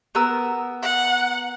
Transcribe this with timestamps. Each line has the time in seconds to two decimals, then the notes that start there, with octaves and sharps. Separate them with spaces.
0.15 B3 A#4 E6
0.83 F#5